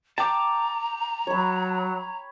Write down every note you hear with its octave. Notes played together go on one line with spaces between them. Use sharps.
G5 A5 A#5 D6
F#3 C#5 B5